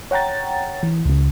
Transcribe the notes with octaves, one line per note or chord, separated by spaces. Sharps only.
C#5 F#5 G5 A#5 A6
E3
C#2 C#3